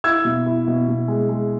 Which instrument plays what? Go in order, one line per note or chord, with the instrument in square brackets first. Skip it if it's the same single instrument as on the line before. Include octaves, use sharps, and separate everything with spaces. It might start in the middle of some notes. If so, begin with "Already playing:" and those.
[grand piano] E4 E6 G#6
B2
E4
B2
B2
G#3
G#3